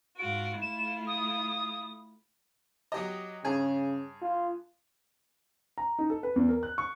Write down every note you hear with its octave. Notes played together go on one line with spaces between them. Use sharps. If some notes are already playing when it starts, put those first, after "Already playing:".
G#2 F4 F#4 D7
A3 E4 F4 E7
D#6
F#3 G4 D#5
G2 C#3 G#4 G#5
F4
A#5
D#4
A4
B4
E2
A#4
F#6
C#6